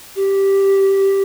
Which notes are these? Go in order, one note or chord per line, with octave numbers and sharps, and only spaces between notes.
G4